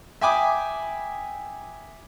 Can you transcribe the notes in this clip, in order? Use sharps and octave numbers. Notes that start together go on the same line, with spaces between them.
E5 G5 G#5 B5 D6 D#6